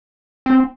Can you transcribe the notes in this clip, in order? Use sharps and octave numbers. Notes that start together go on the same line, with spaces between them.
C4